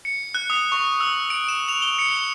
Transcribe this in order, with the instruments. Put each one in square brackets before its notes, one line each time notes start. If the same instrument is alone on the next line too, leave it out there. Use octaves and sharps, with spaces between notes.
[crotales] C#7
F#6
D#6
C#6
E6
D7
E7
F7
G7
C#7
G7